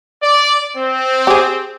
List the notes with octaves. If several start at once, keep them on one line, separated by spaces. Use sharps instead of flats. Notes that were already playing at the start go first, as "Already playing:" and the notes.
D5
C4
G4 G#4